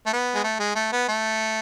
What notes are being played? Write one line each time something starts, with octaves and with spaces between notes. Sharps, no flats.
A3
B3
G#3
A3
G#3
A3
B3
A3